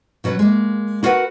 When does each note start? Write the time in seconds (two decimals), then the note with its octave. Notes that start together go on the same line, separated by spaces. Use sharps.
0.24 B2 F#3 C#4 B4
0.39 G#3 A#3
1.03 E4 F#4 A#4 B4 F#5